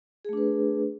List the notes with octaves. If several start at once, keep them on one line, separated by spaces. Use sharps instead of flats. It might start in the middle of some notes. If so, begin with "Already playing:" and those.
A3 D4 G#4 B4